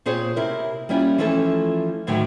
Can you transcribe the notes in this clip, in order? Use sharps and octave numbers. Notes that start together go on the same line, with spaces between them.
A#2 C4 G#4 C5 C#5
C3 E4 A#4
G3 A#3 C#4 E4 F4 G4
E3 F3 A3 C#4 E4 A4
D2 A2 D#3 F#3 A3 G5